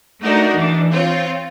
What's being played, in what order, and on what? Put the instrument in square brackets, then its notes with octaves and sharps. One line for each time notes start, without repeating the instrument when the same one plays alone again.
[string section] A3 D4 D#4 F#4 A#4
E3 D4
C4 F4 C#5